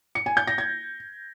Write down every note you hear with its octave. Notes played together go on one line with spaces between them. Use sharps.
C#7
G#5
G6
A#6
G#6